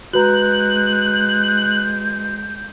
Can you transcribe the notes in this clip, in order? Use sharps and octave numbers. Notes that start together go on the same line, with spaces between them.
G#3 F#4 B4 A#5 F#6 G6